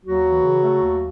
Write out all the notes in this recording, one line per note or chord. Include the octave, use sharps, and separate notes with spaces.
D#2 F#3 F#4
E3
C#3
A3
D#2